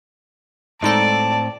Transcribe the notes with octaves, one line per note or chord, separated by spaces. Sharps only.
A2 G#3 C4 D#4 A4 D5 A5